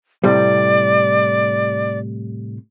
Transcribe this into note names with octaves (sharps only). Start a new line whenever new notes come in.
A2 C3 G3 D5